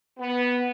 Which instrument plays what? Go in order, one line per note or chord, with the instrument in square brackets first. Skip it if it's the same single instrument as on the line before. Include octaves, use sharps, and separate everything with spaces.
[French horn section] B3